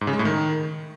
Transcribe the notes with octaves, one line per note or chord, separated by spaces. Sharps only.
G#2
C#3
G#3
A2
D#3